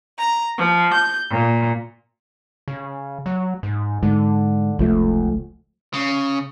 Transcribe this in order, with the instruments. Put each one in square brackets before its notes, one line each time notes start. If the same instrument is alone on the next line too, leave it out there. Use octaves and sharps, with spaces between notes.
[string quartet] A#5
F3
G6
A#2
[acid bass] C#3
F#3
G#2
[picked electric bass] G#2 [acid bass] D3
[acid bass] F1 [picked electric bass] C#2 F3 A3
[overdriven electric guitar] C#3